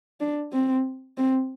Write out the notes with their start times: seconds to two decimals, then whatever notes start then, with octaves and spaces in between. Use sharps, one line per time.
0.21 D4
0.52 C4
1.18 C4